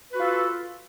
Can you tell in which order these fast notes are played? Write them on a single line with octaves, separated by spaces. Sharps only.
B4 F#4 F4 A4